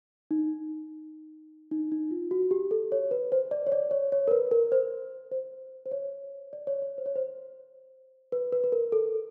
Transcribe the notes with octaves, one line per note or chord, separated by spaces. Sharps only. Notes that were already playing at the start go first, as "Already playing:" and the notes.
D#4
D#4
D#4
F4
F#4
F#4
G4
A4
C#5
B4
C5
D5
C#5
D5
C#5
C#5
A#4
B4
A#4
C5
C5
C5
C#5
D5
C#5
C#5
C5
C#5
C5
B4
B4
B4
A#4
A4